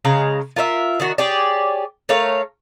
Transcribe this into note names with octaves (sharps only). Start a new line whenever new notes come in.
C#3 G#3 F5 A#5
F4 A#4 C#5 E5
D#3 D4 F#4
G4 G#4 C#5 D5
A3 A#4 C#5 F5